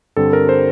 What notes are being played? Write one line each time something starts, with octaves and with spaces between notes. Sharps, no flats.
G2 D3 G3 C4 A4
A#4
C5